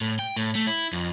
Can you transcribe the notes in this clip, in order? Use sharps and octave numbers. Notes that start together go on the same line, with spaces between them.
A2
G5
A2
A3
E4
F2